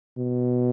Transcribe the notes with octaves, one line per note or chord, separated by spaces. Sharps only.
B2